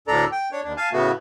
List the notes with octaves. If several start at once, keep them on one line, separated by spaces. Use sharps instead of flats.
D2 A2 D4 A4 D5 A#5
G5
D4 C#5
D#2 D4
F5 G#5 A5
A2 C#3 A3 B3 F#4